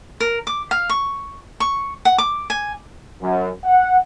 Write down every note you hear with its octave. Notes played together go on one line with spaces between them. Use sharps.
A#4
D6
F5
C#6
C#6
F#5
D6
G#5
F#2
F#5